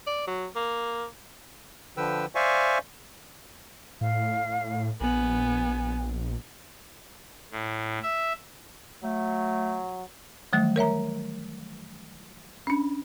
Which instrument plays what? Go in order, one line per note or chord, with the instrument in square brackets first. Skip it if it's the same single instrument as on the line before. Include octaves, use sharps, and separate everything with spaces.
[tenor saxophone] D5
F#3
A#3
[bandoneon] D3 F3 B4 G5 E6
C5 D5 E5 F5 G#5 C#6
[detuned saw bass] A2 [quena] F5
[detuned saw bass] A#1 [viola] B3 [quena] G#5
[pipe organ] A2
E5
[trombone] F#3 [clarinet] A3
[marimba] D#3 E3 F#3 G3 A3
A#4 C#5 E5 A#5
C#4 D4